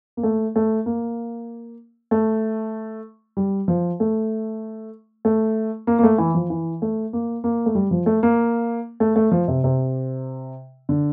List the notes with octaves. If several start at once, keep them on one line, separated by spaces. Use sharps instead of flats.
A#3
A3
A3
A#3
A3
G3
F3
A3
A3
A#3
A#3
A3
E3
F3
E3
A3
A#3
A#3
A3
G3
F3
A3
A#3
A3
A3
F3
C3
C3
D3